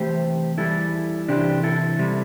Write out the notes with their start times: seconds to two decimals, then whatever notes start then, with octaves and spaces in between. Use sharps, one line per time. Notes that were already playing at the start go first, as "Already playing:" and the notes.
Already playing: C2 C3 E3 A3 G4 C5
0.58 E2 E3 G3 E4 A4
1.28 C2 C3 E3 D4 G4
1.63 E4 A4
1.99 C3 G3